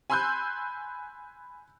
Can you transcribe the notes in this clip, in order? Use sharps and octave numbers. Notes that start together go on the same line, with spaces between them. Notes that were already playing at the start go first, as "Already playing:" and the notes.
G#5 B5 C6 E6 F#6 G6